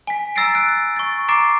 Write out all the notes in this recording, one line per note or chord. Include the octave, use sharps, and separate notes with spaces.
G#5 B6
A#5 E6 A6 A#6 C7 D7
F#6 A6 D7
C#6 A6
A#5 D6 A6 C7 D7